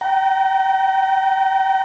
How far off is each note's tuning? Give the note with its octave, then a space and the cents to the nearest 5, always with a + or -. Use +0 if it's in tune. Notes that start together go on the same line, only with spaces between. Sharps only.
G5 -40 A#5 +0